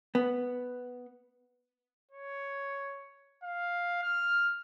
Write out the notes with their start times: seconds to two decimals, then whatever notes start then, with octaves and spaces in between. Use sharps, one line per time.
0.15 B3
2.11 C#5
3.44 F5
4.03 F6